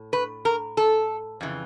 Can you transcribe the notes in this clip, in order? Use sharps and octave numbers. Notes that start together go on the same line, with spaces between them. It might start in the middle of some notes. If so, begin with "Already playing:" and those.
Already playing: A2
B4
A#4
A4
F2 C#3 E3